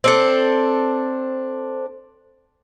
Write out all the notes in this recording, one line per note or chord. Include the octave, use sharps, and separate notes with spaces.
C4 D4 A4